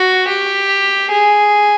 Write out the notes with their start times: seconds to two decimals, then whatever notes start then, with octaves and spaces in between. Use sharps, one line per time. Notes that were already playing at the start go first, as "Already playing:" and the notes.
Already playing: F#4
0.28 G4
1.11 G#4